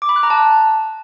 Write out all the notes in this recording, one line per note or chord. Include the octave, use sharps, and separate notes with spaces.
D6
B5
F#6
A#5
A5